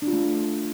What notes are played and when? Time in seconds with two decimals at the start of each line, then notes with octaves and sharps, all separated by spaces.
0.02 D4
0.07 F4
0.13 A3